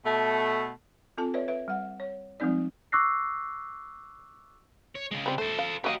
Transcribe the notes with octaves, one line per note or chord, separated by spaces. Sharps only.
B2 A3
C4 F4 A4 A5
B4 C#5 D5 E5
B4 E5
G3 F#5
C#5
F3 G3 G#3 C4 D#4 D5
C#6 D6 E6 F#6 A#6 C7
C#5
C#3 G#3
G3 C4
A3 A4 C5
F5
F#3 F4 G4 D#5 F5